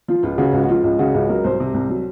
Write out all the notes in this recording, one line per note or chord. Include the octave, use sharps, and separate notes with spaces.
F3 F4
C#2 F4
C#3 F#4
C#2 F#4
F#4
F3 F4
C#2
C#3 F#4
C#2
F#3 A#4
C2 C5
C3
C2
F#3